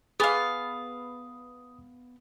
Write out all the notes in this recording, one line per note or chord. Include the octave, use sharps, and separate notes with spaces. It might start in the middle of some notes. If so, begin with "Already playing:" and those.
B3 G#4 F5 G#5 D#6